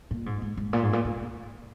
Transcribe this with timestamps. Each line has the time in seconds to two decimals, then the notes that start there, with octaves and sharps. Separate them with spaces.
0.11 A#2
0.26 G#2
0.42 G#2
0.57 G#2
0.73 A#2
0.83 G#2
0.93 A#2
1.05 A#2